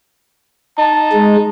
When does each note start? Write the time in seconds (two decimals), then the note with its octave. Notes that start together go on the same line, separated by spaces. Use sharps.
0.78 D#4 A5
1.13 G#3